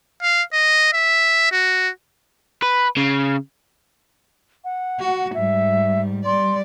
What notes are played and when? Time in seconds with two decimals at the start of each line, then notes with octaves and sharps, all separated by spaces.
0.22 F5
0.53 D#5
0.93 E5
1.52 F#4
2.63 B4
2.97 C#3
4.64 F#5
5.00 F#4
5.34 G#2 G3 E5
6.25 G3 D5 C6